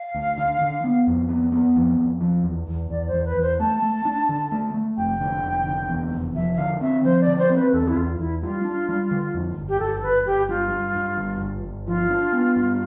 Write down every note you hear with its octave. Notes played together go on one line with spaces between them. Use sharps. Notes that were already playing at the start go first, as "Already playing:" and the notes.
Already playing: F5
D2
D3
D3
B3
F2
B3
B3
F2
F2
F3
E2
E2
E2 D5
C5
E2
B4
E2 C5
A3 A5
A3
D4
D3
A3
A3
F1 G5
D3
F1
D3
E2
F1
F3 E5
E5
D3 F5
C4 E5
F3 C5
D5
D3
C5
C4
B4
E2 A4
E4
E2 F4
E2 E4
G3 F4
D4
G3
D3
F2
G1
G4
G1 A4
G1 B4
G1 G4
G2 F4
G2
G2
G1
G1
G1
F3 F4
D4
B3
G2